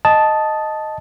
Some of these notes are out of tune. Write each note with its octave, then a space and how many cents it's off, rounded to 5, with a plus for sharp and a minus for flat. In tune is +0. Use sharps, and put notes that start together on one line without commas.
D#5 +0 A5 -5 D#6 +0